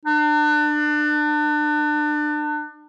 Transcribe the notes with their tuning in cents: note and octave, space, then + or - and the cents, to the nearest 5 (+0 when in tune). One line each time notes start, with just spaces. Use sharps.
D4 +30